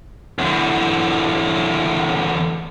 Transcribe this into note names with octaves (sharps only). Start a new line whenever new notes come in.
E2 D3